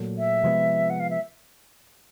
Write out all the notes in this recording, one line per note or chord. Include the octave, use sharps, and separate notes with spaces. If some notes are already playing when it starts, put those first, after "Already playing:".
Already playing: A#2 F#3 A3
E5
C3 F3 G#3 B3
F#5
F5
E5